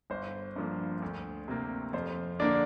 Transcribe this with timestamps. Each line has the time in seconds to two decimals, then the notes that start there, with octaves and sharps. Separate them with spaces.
0.10 G1 C5
0.56 G2 F3 A#3
1.02 D2
1.48 C3 A#3
1.93 F2 C5
2.39 D3 A#3 D4 D5